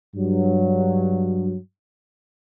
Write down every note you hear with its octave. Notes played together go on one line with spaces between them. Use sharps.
G2 F#3